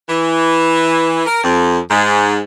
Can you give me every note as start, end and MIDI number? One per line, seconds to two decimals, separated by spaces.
0.08 1.22 52
1.26 1.42 70
1.42 1.78 41
1.89 2.39 44